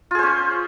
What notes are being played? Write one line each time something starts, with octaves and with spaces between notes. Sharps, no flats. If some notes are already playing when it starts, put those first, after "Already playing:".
C#4 F4 G#4 C5